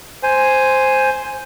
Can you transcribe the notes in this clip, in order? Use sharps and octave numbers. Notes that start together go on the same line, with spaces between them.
C5 G#5